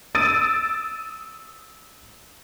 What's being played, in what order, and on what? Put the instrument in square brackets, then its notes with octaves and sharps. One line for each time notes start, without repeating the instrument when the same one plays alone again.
[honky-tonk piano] D#6 E6 A6 D7 D#7